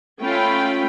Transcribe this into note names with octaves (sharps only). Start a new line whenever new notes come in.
A3 C#4 F4 G5 B5